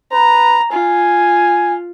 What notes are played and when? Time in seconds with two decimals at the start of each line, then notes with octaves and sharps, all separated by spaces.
0.12 B4 A#5
0.72 F4 G#5